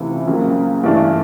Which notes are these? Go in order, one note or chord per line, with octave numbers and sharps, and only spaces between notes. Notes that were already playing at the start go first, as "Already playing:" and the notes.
Already playing: C#2 C3 E3 A3
C#2 C#3 F#3 A#3
G2 E3 A3 D4